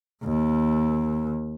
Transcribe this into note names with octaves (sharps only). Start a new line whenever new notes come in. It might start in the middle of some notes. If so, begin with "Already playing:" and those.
D#2